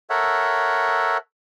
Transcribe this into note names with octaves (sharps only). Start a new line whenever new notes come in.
A4 A#4 C#5 E5 F#5